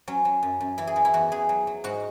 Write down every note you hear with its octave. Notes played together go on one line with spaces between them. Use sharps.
F#3 C#4
F#3
F#2
F#2
E3 E4
G#4
E3
E4
E2 F#4
E2 G#4
F#3
F#3
G#2 F#4